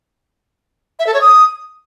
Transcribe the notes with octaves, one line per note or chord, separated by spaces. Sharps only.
E5
A4
C#5
D#6